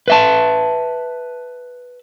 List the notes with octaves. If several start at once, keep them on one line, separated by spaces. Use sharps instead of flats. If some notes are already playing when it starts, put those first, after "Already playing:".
B4 E5 A5